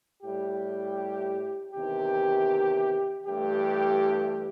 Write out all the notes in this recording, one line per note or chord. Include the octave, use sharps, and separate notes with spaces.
A2 G3 G4
E2 C3 D#3 G4
G2 E3 A3 G4